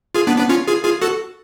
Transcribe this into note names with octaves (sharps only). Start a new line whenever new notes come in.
F4 G#4
B3 D4
B3 D4
C#4 F4
F4 G#4
F4 G#4
F#4 A4